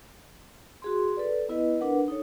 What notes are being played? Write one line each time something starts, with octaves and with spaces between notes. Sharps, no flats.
F#4 G#4 C6
A4 B4 D5
B3 E4 B4 D#5
D4 A#4 B4 F#5
D#4 A4 C#5